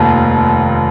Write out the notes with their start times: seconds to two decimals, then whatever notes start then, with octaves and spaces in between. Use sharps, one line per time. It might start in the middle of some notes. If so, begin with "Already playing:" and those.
Already playing: F1 D#2